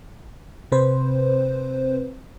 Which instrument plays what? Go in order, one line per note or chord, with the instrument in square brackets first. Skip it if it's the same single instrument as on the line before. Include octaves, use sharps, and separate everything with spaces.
[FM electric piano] C3 C4 B4 C5